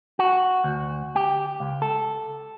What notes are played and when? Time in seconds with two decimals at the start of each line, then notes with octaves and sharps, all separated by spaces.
0.19 F#4
0.64 D2
1.16 G4
1.60 C#2
1.82 A4